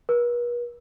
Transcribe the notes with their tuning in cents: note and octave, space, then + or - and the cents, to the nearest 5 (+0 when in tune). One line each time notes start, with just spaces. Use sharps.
B4 -45